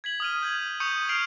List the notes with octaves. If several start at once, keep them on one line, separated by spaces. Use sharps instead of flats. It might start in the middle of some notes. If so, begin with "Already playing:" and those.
G#6 B6 F#7
D#6 F6 D#7
G6 G#6 F#7
C#6 D#6 G6 C#7 D#7
F6 C7 D7 F7 F#7